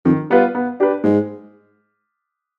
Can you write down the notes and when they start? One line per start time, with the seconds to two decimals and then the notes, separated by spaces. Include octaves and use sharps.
0.05 F2 D#3
0.30 G3 B3 F4 B4
0.55 B3
0.80 D4 G4 B4
1.04 G#2 G#3